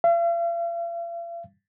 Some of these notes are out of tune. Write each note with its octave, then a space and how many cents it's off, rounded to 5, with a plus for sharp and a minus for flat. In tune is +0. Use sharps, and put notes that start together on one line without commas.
F5 -45